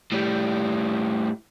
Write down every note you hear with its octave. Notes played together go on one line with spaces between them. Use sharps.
A2 G3